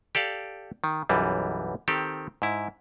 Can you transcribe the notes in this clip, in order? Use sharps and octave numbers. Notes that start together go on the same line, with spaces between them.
G4 A4 D5 F5
D#3
B1 F#2 E3 G3
D#3 C4 G4 A4
G#2 E4